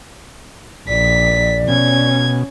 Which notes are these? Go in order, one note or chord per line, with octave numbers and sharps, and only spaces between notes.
A#1 D5 B6
B2 C#4 G#6